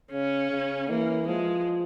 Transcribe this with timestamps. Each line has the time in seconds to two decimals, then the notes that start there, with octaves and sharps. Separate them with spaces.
0.12 C#3 C#4
0.51 C#3
0.90 E3 A#3
1.28 F3 G#3